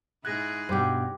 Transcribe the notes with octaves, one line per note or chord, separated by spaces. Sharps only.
G#2 E4 G#4 F#6 G#6 A#6
G2 B2 G4 C5